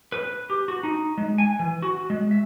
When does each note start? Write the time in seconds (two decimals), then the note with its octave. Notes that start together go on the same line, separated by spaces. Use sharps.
0.12 B4
0.50 G4
0.68 F#4
0.83 D#4
1.18 G#3
1.38 G#5
1.59 E3
1.82 F#4
2.10 G#3
2.31 E5